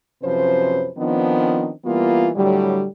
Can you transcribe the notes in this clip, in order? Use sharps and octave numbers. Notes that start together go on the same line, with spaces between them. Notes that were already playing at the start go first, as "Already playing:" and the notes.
F#2 C3 F3 C#4 B4 C5
D#3 F3 B3 C4 D4 D#4
E3 G3 A#3 B3 F4
A2 D3 F#3 G3